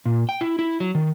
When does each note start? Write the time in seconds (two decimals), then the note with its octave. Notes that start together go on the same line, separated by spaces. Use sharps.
0.06 A#2
0.29 G5
0.41 E4
0.59 E4
0.80 F#3
0.95 D#3